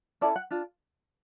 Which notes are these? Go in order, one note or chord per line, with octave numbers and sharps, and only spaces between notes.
C#4 E4 A4 D5
F#5
D4 F4